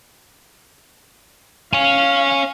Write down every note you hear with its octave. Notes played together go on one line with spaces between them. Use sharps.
C#5 F5 G#5